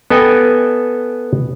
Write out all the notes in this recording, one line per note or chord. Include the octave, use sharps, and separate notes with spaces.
B3 A4 D#5 G5 G#5